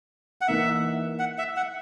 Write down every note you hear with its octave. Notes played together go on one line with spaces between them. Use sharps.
F#5
E3 A#3 D#4 E5
F#5
E5
F#5